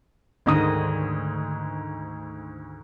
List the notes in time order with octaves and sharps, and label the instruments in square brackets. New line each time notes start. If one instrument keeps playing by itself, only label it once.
[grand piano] D2 G#2 D#6 [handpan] D3 D#3 D#5